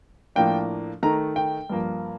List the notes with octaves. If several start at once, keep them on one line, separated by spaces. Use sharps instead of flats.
A2 F3 A#3 D4 G5
D#3 A3 D#4 A#5
G5
G2 F3 A#3